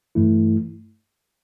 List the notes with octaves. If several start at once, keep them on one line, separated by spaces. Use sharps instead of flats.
G2 E3 A3 E4